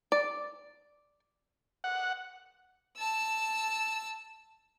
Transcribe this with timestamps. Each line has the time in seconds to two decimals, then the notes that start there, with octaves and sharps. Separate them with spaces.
0.12 D5
1.84 F#5
2.97 A5 E6